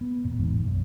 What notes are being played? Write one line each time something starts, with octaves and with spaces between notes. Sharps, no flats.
B3
E1 A#2
A1 E2 G#2
B1 F#2